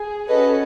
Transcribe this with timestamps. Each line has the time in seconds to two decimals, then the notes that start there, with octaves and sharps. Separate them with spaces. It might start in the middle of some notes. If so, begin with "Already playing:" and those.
Already playing: G#4
0.29 C#4 F#4 A4 B4 D#5